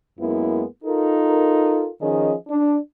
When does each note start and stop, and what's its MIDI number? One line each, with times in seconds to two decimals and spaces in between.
0.19 0.63 42
0.19 0.63 56
0.19 0.63 58
0.19 0.63 59
0.19 0.63 64
0.84 1.88 63
0.84 1.88 65
0.84 1.88 69
0.84 1.88 70
2.01 2.32 51
2.01 2.32 53
2.01 2.32 61
2.01 2.32 68
2.01 2.32 75
2.49 2.76 62